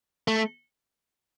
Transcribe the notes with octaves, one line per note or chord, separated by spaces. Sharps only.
A3